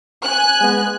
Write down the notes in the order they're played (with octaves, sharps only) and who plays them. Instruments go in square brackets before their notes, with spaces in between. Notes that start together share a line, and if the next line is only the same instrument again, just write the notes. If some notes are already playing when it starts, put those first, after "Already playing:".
[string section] G#5 F#6
[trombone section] G#3 B3